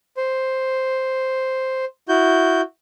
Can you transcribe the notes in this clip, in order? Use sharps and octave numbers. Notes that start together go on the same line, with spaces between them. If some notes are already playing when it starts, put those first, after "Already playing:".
C5
E4 F#4 G6